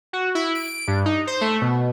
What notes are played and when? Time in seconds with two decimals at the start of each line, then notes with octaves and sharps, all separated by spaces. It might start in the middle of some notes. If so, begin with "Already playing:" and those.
0.13 F#4
0.35 E4
0.55 D7
0.87 G2
1.06 D#4
1.27 C5
1.41 A3
1.61 B2